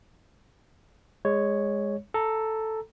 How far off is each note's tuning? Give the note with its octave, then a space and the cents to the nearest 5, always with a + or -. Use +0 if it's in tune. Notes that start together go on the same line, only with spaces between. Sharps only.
G#3 -15 C#5 +0
A4 +0 A#5 -10